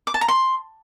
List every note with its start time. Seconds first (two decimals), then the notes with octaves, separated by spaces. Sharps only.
0.07 D6
0.14 A5
0.21 A#5
0.28 C6